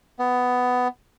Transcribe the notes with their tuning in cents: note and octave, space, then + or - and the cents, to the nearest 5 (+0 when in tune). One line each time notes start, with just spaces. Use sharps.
B3 +10